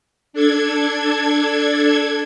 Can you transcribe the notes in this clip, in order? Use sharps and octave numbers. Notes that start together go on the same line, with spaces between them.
D4 A4 G#6